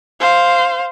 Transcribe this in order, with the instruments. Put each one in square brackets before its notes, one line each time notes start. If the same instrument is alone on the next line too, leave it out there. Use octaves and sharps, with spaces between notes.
[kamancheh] C5 F5